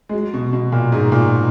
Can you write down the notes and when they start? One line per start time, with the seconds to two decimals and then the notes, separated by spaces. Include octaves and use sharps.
0.09 G#3
0.13 F#3
0.34 B2
0.53 B2
0.72 A#2
0.92 G#2
1.12 A#2